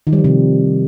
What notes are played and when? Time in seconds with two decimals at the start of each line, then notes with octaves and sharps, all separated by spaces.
0.07 D#3
0.13 G3
0.18 F3
0.24 C3